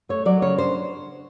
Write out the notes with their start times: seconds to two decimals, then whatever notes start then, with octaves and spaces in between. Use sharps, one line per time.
0.09 A3 C#5
0.26 F#3 D5
0.42 C#3 C#5
0.58 D4 C5